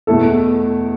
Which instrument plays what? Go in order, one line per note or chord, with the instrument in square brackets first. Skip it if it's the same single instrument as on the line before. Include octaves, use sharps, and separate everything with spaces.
[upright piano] E2 B2 A3 E4 A4